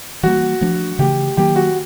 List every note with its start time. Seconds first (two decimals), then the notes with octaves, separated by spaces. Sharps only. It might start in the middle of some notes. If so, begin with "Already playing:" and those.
0.23 E3 G3 A#3 F#4
0.61 F3 A3 D4
0.99 C#3 E3 A3 G4
1.37 D#3 F#3 A#3 G4
1.56 F#4